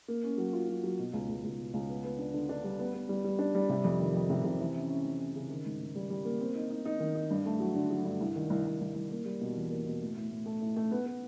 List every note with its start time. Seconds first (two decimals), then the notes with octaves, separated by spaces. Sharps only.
0.08 A#3
0.23 C#4
0.38 F#3
0.53 F4
0.68 F#3
0.84 F#3
0.99 B2
1.13 C#2
1.29 C#2
1.44 C#2
1.58 B2
1.74 C#2
1.89 B3
2.04 B3
2.18 D4
2.33 D3
2.49 D4
2.64 G3
2.79 B3
2.94 B3
3.09 G3
3.24 G3
3.39 D4
3.55 G3
3.69 C3
3.85 F2
4.00 D#3
4.14 F2
4.30 C3
4.44 C3
4.60 E3
4.75 C#4
4.90 C#4
5.04 E3
5.20 C#4
5.35 C#3
5.50 D#3
5.65 G#2
5.80 G#2
5.95 G3
6.10 G3
6.25 A#3
6.41 C4
6.55 D#4
6.70 D#4
6.85 D#4
7.00 D#3
7.15 D#4
7.30 G2
7.46 A3
7.60 F#3
7.76 D3
7.90 F#3
8.05 G2
8.20 C2
8.36 D#3
8.50 C2
8.66 C2
8.81 C2
8.95 C2
9.11 A#3
9.25 G3
9.41 B2
9.56 E2
9.70 A#3
9.86 B2
10.01 A2
10.16 A2
10.31 A2
10.46 A3
10.62 A2
10.76 A3
10.91 B3
11.06 B3